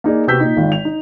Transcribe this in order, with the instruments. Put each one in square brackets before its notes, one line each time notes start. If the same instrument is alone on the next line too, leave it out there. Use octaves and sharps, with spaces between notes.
[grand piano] A#3 D#4 G#4 D5
C3 B3 F#4 E6 G6 B6
A#2 D#4
G#1 D#3 F4
F7
D#4